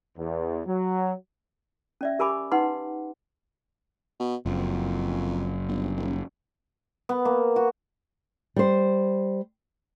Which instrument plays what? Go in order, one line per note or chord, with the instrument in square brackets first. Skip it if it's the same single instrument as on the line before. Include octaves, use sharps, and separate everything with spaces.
[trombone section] E2
F#3
[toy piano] C#4 D5 E5
G4 A#4 G#5 B5 D6
D#4 B4 F#5 C6
[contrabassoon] B2
[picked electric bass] F#1 [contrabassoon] F2
[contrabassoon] G1
D#1
[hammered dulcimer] B3
A#3
F#4
[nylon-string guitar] G3 C5